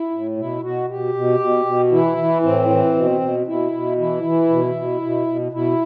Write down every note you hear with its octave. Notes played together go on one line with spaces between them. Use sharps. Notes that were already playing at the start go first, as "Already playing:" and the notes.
Already playing: E4
A2
B2 E4
B2 F#4
B2 G4
B2
B2
B2
E3 E4
E3
A2 C4
E3
B2
B2
B2 E4
B2
E3 E4
E3
B2
B2
B2
B2
B2 E4